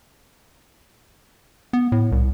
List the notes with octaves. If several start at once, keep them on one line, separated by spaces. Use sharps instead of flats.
B3
A2
C2